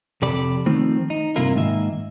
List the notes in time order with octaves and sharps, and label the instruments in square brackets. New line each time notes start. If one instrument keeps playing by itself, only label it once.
[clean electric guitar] F2 C3 G4 A4 D5 B5
D#3 F3 A3 C4
D#4
G2 C3 A#3 E4 F4 A#4
G#2 D#3 A#3 D#5 E5